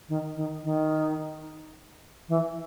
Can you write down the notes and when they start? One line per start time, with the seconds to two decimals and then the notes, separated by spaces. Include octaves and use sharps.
0.09 D#3
0.36 D#3
0.64 D#3
2.29 E3